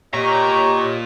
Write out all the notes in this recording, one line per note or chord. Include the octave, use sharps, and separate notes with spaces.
A#2 G4 C#5 D#5 A#5 C#6